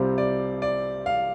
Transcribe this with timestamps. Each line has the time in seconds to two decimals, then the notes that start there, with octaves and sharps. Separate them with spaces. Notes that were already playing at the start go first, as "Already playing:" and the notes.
Already playing: C2 C3 G3 C4 F4 C5
0.18 D5
0.62 D5
1.06 F5